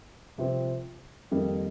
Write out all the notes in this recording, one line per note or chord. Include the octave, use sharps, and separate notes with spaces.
C2 C3 F3 C4
F2 D#3 G3 A#3 D#4